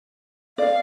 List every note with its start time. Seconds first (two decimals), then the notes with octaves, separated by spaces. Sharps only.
0.58 D5 F5